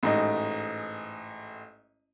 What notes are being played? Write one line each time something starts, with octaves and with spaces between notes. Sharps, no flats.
A1 G#2 D#5